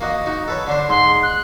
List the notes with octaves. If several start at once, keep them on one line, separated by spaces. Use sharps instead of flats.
A#3 F#4 D#5
D#4 F#4
A4 B4 C#5
D3 D4 C5
G#2 C6
F#6